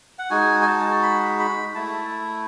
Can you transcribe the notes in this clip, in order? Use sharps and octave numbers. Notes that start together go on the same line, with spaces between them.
F#5
G#3 D#4 F#4 G#5
G#5
A5
B5
B5
A3 E4 A5